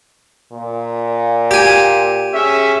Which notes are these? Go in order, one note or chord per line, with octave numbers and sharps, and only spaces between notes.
A#2
G4 G#5
C#4 G#4 E5